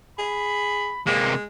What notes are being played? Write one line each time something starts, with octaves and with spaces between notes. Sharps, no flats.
G#4 B5
C3 G#3 A#3